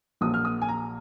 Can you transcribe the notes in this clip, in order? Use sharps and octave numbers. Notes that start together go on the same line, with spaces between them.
A#1 A#2 F#3 A#3 D#6
F6
D#6
G#5
A#5